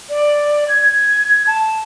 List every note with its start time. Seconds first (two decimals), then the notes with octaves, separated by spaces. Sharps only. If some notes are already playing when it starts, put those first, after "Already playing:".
0.09 D5
0.68 G#6
1.47 A5